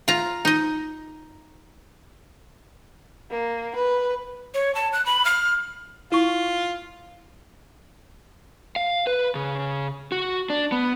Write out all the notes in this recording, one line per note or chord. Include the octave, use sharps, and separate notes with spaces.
F4 A#5
D#4 D#5
A#3
B4
C#5
A5
F#6
B5
F6
E4 F4 C#6
F5
B4
C#3
F#4
D4
B3